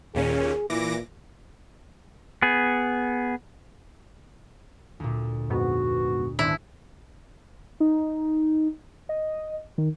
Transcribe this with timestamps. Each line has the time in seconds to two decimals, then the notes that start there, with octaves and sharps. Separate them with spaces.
0.15 D#2 A#2 C#4 G#4
0.70 A#2 E3 D6 A#6
2.42 B3 G#4
5.00 D2 A#2
5.50 F2 G#2 B3 F#4
6.39 G#1 B3 D4 E4 B4 C5
7.80 D#4
9.09 D#5
9.78 D#3